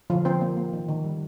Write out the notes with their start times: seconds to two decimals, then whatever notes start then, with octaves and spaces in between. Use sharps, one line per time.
0.10 D3 F3 F4
0.25 C4 C5
0.41 A#3
0.57 A#3
0.73 D#3
0.88 D#3
1.05 G3